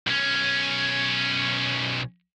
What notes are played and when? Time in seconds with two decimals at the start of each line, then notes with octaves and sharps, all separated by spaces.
0.07 B1 C#4